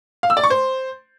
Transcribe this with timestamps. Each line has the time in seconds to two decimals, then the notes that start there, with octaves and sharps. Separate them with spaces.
0.23 F5
0.30 E6
0.37 D5
0.44 C#6
0.50 C5